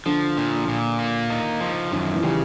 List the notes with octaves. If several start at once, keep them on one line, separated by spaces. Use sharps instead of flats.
D3 F3
A#2
A#2
A#3
D#4
F3
F#2 D#3
E3
C#3 G3